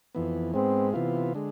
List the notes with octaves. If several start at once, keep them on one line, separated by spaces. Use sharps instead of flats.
F2 E3 B3
G#2 G#3 B3 C4
C3 E3 B3 F4
D3 G#3